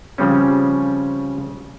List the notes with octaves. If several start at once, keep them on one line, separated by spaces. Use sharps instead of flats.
C#3 F3 G3 C4 C#4